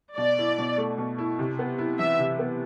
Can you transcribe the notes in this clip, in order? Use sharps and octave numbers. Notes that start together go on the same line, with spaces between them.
B2 D5
E4
B2
A3
B2
E4
C3
B3
E4
E3 E5
C3
B3